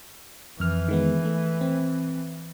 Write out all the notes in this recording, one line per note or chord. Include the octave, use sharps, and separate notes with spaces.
F2 E3 F6
D#3 G#3 B3
A3
C4